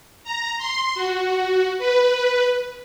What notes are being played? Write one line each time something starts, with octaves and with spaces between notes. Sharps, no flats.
A#5
C6
F#4
B4